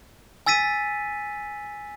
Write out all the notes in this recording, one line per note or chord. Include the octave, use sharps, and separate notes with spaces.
G#5 E6 A6 B6 D#7